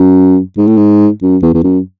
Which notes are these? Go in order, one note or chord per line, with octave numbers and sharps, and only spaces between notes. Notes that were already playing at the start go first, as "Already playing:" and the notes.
Already playing: F#2
G#2
A2
G#2
F#2
E2
E2
F#2